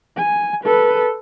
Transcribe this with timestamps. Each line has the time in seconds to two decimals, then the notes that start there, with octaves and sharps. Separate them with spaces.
0.17 G#5
0.64 A4 B4